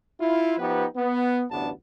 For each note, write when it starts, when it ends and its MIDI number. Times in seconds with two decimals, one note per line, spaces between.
0.20 0.57 64
0.20 0.57 65
0.58 0.85 53
0.58 0.85 59
0.58 0.85 63
0.58 0.85 67
0.58 0.85 71
0.96 1.44 59
1.50 1.70 33
1.50 1.70 38
1.50 1.70 43
1.50 1.70 59
1.50 1.70 62
1.50 1.70 81